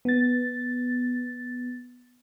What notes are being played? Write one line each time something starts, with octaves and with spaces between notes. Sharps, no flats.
B3 A6